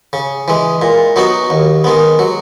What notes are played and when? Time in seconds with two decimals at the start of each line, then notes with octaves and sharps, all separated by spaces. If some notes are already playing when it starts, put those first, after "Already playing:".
0.13 C#3
0.48 E3 G#3
0.82 A#2
1.16 F#3 B3 D#4 F#4
1.50 D#2
1.84 D#3 G#3 B3
2.19 F#3